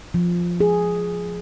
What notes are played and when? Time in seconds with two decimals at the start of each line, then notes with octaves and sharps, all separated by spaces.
0.14 F3
0.60 G#4